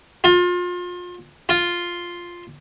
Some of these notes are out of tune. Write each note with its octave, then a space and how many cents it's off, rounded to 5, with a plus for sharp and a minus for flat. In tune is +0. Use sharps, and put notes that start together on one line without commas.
F4 +30
F4 +0